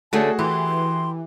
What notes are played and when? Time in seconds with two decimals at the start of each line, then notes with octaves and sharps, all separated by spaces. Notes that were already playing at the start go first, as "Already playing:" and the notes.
0.13 D3 A3 C#4 F#4 G#4 A5
0.39 E3 G4 C6